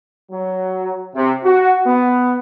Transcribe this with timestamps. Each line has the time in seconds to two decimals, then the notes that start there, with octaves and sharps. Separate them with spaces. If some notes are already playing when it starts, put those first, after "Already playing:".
0.31 F#3
1.15 C3
1.45 F#4
1.87 B3